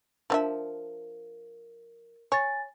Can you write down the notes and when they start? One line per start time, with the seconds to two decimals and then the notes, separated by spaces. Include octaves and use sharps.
0.30 F3 D4 A#4 E5
2.32 C#5 G#5 A6